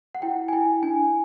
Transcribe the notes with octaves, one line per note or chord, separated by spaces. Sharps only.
F#5
E4 G5
G#5
E4 G5
D4 G#5